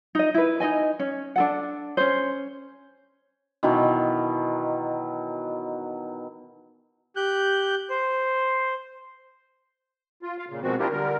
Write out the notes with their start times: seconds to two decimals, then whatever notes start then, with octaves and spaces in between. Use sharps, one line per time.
0.15 D#4 D#5
0.34 E4 B4
0.60 D#4 F#4 D#5 G#5
0.99 C#4
1.36 D4 A4 F#5
1.97 C#4 C5
3.63 B2 D#3 E3 F#3
7.16 G4 F#6 G6
7.90 C5
10.23 F4
10.38 F4 F5
10.49 A#2 C#3
10.62 B2 D#3 F3 G#3 C4 F#4
10.79 C4 D4 E4 F4 G4 A#4
10.91 D3 G3 A#4